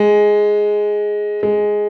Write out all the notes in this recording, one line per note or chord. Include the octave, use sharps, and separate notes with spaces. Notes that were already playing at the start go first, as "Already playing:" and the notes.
Already playing: G#3
G#3